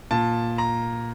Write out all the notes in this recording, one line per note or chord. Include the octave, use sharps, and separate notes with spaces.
A#2 A5
A#5